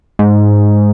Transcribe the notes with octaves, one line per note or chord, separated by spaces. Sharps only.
G#2